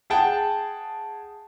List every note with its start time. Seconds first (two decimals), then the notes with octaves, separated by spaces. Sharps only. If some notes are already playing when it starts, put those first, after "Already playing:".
0.10 G#4 F#5 G5 A5